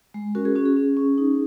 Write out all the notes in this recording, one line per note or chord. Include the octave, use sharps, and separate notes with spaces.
G#3
C#4 F#4 A#4
G#4
C#4 F#4
G#4
C#4
C#4
D#4